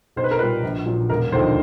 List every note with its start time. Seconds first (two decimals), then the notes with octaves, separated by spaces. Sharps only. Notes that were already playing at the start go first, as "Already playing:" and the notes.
0.16 B1 C5
0.24 B4
0.31 A#4
0.39 A#2 G3 B4
0.63 A#1
0.86 A#2 F#3
1.09 E1 A#4
1.32 D#2 D3 F3 C5